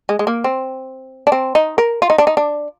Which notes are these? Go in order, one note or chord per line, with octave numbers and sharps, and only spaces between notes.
G#3
G#3
A#3
C4
D4
C4
D#4
A#4
F4
D#4
D4
D#4
D4